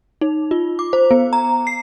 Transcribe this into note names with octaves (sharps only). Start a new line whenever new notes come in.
D#4
F4
D6
C5
B3
A#5
C7